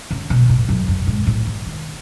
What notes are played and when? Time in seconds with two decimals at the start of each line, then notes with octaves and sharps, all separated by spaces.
0.11 C#3
0.30 B2
0.49 A2
0.69 F#2
0.88 F#2
1.07 G#2
1.27 A2
1.47 D#3
1.66 D#3